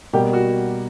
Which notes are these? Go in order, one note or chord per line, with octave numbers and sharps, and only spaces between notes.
B2 G3 A#3 G4
F#4